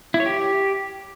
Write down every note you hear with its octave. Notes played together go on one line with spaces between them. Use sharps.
E4
C#5
G4